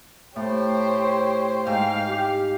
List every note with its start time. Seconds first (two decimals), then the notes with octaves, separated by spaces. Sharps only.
0.36 A2 G4 C5 C#5
1.67 G#2 F5 G5
2.08 G4